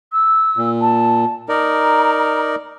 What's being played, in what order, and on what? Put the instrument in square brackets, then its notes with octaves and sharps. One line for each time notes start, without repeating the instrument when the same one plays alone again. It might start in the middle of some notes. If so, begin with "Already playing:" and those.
[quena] E6
[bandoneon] A#2
[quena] A5
[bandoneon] D#4 A#4 D5 [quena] A#5